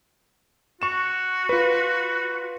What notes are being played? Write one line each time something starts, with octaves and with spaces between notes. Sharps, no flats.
F#4 C#6 E7
F4 B4